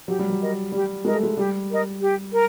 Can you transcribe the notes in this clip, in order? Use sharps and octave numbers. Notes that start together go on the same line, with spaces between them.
F#3 G4
G3
F#3
A#4 D#5
G3 G4
G#3 A#4 D#5
A3
G#3
G3 G4
A#4 D#5
G4
A#4